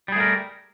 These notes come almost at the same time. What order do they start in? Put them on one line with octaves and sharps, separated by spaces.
G3 G#4 A3 A#4